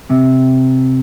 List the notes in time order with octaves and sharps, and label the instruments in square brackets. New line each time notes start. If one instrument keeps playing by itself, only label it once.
[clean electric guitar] C3